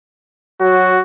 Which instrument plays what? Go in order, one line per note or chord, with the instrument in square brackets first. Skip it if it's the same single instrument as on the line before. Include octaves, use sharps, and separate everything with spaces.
[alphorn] F#3 [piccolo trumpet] F#4